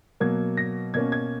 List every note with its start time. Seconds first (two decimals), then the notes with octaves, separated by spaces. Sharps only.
0.20 B2 F#3 A#3 G#6
0.57 A#6
0.94 B2 A#3 C#4 G#6
1.12 G#6